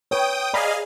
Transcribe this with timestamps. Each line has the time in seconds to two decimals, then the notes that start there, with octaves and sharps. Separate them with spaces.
0.11 B4 C#5 G5 D#6
0.54 G#4 D5 D#5 F5 A#5 B5